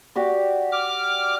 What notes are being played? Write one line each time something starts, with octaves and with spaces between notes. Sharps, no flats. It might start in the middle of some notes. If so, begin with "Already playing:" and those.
F#4 G4 D5
D6 F6